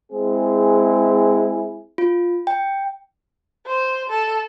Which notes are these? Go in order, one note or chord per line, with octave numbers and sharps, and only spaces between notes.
G#3 C4 E4 G#4
F4
G5
C5
A4